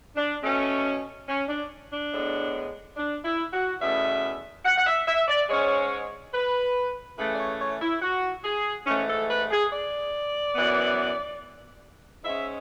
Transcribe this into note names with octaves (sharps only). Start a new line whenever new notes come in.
D4
B2 A3 C#4
C#4
D4
D4
A2 G#3 B3
D4
E4
F#4
E2 B2 A3 C#4 E5
F#5
F#5
E5
E5
D5
G#2 G#3 C#4 C#5
B4
C#3 E3 A3 C#4 B4
D5
C#5
C#5
E4
F#4
G#4
G#2 E3 A3 C#4
A4
B4
G#4
D5
F#2 E3 B3
G#2 G#3 C#4 E5